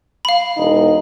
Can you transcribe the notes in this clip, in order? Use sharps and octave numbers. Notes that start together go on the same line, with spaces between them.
F5 B5
E1 D#4